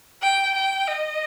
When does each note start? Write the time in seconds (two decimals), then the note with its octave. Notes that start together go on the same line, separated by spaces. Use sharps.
0.22 G5
0.55 G5
0.88 D#5